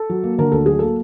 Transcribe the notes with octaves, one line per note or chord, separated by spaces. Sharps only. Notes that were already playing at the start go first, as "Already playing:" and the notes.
Already playing: A4
F#3
A#3
D3 A#4
D2 A4
F#3 G#4
A#3 A4